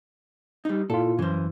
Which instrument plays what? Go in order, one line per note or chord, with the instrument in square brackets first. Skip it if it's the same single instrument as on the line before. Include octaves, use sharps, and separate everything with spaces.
[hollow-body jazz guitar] G3 D#4
[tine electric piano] A#2 E4 F4 [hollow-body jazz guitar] A4
[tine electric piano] F#2 [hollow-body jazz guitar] E3 C5